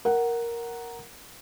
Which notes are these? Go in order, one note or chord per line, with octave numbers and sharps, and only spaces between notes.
A#4 F#5